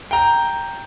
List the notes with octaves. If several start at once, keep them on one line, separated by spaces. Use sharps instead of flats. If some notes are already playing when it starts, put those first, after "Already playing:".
G5 A#5